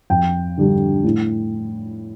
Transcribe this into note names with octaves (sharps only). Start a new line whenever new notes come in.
F2 G5
D3 G3 D4
A2